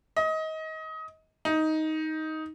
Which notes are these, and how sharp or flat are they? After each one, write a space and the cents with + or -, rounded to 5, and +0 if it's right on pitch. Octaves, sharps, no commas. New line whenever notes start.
D#5 +25
D#4 +10